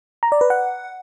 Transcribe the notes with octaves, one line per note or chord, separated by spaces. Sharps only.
A#5
D5
B4
F#5